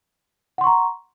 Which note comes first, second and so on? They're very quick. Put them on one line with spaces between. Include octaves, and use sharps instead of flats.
F#5 C6 C#6 A#5